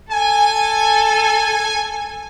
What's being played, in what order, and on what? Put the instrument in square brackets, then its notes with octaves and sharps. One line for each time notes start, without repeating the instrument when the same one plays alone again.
[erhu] A4 [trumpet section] G#5